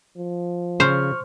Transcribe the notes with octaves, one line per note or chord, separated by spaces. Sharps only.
F3
C#3 C5 C#6 F6